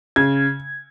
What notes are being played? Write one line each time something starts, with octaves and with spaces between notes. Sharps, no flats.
C#3 G#6